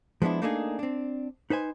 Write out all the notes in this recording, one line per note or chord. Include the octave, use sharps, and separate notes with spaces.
F3 G#3 B3 D4 E4
A3 A#3 D4 D#4 G4 G#4
C4 D4
D#4 B4 C5 G#5